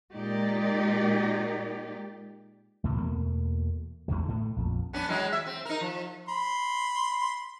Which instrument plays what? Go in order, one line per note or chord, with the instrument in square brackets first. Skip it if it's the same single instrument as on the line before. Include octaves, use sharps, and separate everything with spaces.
[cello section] A#2 G#3 D#4 G4 D5
[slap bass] C#2 A2 C3
E2 B2 A3 A#3
A1 E2 D3 F#3
A2 A3
A#1 F2
[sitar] B3 C#4 D4
E3 F#3 G#3
E5
C4
D#4 A#4
F3
[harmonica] B5 C6